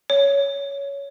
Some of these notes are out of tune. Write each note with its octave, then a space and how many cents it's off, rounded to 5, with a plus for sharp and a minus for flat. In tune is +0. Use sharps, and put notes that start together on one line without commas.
C#5 +15